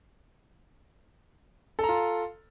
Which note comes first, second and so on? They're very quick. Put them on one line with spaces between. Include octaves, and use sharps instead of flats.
A4 A#5 F4